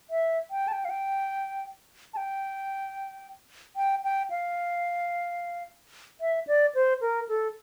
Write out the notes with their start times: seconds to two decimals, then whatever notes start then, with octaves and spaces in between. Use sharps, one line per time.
0.10 E5
0.51 G5
0.68 A5
0.73 G5
0.85 F5
0.90 G5
2.14 A5
2.17 G5
3.76 G5
4.04 G5
4.30 F5
6.21 E5
6.47 D5
6.75 C5
7.01 A#4
7.29 A4